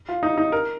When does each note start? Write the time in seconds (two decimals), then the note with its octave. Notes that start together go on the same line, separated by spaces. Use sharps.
0.09 F4
0.23 D#4
0.38 D#4
0.52 A#4